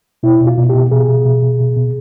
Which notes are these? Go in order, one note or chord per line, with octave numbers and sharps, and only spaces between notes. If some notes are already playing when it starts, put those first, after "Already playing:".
B2 E4
B2
F4
B2
G4
B2
B2 G#4
B2
B2
B2
B2
B2